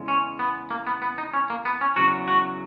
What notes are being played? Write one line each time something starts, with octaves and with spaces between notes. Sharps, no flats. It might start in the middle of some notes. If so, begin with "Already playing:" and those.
Already playing: E2 C#3 G#3
C#4
B3
A#3
B3
B3
D#4
C#4
A#3
B3
C#4
E2 C#3 F#3 F#4
F#4